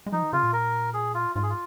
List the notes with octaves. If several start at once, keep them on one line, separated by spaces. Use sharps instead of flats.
G#3
F3 D#4
D#3
C#3 F4
A#2
A#4
G#4
F4
G#2 F4
G#4
F4